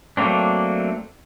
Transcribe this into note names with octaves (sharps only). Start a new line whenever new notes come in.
F#3 A3 A#3 C4 D4